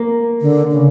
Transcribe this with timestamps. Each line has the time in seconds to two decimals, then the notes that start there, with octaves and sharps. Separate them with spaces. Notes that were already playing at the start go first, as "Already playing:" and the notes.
Already playing: A#3
0.41 D3
0.71 C#3